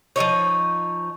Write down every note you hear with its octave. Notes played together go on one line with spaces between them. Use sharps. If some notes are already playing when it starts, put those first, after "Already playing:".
F3 C4 D#4 C#5